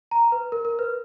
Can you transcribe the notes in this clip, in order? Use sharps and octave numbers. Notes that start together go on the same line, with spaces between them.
A#5
B4
A#4
A#4
B4